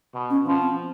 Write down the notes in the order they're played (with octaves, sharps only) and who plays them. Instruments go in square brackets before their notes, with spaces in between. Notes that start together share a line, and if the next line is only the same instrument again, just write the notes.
[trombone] B2
[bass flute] C#4
[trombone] F3 [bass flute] C#4
[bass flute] C4